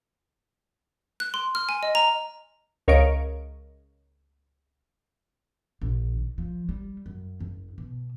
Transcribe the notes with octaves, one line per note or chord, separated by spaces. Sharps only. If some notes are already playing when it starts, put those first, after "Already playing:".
F#6
C6
F6
G#5
D#5
A#5
C#2 A#4 C#5 D#5 F5 D7
A#1
D#3
F3
G3
F#2
F#1
B2